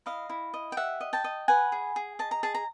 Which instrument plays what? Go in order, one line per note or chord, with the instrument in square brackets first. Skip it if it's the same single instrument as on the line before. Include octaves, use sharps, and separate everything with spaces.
[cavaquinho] E4 D#5 F5
E4
D#5
G5
G4 E5 F#5
D#5
G5 A5
D#5
B4 F#5 G#5
G#4
G#4
D#5 A5
A#5
G#4 A5
A#5